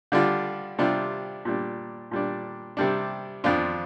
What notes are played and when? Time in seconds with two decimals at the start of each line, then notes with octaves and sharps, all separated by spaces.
0.12 D3 G3 D4 F4
0.78 C3 G3 D4 F4
1.45 A#2 G3 D4
2.11 A#2 G3 D4
2.77 C3 G3 D4
3.44 F2 F3 D4 F4